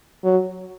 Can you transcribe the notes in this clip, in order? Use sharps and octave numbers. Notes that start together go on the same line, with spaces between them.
F#3